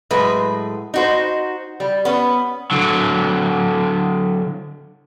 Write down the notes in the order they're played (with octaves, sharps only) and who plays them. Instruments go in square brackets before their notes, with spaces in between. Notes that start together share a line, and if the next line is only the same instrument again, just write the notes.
[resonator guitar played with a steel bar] A2 F#3 G#3 B4
D#4 F#4 C5
G3
B3 C#4
[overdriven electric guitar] D3 F#3